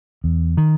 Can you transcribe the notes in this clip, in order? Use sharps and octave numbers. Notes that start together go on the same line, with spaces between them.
E2
D#3